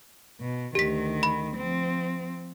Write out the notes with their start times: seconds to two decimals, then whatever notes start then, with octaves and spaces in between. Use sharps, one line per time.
0.41 B2
0.75 D2 D#3 G4 B6
1.23 B5
1.57 F3 C4